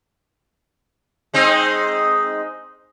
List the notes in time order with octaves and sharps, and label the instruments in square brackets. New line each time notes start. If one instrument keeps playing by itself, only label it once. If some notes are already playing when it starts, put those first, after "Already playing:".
[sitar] G#3 C4 D#4